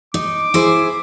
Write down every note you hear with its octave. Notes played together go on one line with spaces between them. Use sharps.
D#4 D6
E4 G#4 C5